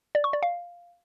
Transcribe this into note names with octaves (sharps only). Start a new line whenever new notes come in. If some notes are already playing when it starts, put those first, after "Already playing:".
D5
C#6
D5
F5